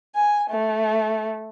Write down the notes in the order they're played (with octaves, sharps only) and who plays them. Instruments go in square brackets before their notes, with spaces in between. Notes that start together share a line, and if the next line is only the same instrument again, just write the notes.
[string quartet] G#5
A3